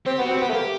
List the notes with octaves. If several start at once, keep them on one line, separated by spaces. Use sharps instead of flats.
C4 G4
B3
F#4
C4
B3 G4
A3
A#3 G4